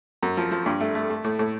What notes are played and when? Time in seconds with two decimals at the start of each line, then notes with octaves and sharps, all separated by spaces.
0.23 F#2
0.37 F3
0.51 F3
0.66 G2
0.81 A3
0.95 A3
1.10 A3
1.24 A2
1.39 A2